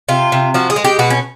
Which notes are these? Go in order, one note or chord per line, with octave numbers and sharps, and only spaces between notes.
C3 F4
C3
F3 F#4
G#4
G#3
G4
B2 F#4
C#4